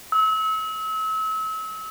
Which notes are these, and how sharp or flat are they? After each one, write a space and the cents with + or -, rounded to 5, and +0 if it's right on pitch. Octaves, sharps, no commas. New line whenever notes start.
E6 -35